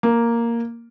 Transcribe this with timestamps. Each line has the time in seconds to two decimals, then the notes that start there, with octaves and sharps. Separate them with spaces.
0.03 A#3